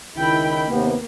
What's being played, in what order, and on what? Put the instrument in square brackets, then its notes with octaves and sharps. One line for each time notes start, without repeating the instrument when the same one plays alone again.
[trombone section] C#2 D#3 [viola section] E4 G5 B5
[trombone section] D#2 C3 B3 [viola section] A#3